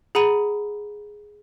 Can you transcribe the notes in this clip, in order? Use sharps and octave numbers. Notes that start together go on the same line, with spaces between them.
G#4 F#5 A#5 B5 D#7 F#7